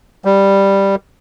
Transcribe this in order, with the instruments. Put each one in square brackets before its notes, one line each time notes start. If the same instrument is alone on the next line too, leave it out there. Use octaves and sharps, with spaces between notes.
[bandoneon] G3